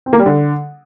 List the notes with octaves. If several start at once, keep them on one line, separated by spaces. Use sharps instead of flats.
C4
A#3
G3
D3